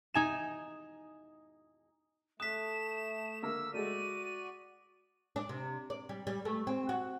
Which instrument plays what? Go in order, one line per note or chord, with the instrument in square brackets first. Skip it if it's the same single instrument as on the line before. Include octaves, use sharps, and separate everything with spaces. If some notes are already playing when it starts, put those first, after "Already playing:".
[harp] D#4 G#5 E7
[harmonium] A3 [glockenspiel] D#6 B6 [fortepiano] F#6 [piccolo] E7
[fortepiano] D3 A#3 A#4 [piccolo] E6
[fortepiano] G#3 A3 [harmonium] F#4 D5 [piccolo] D#7
[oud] D4
C3
D5
G3
G3
A3
C4
F#4